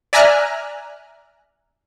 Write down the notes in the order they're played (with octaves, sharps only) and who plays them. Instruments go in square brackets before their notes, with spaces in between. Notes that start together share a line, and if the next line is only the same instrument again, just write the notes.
[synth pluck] D5 E5 G#5 A#5 F6 F#6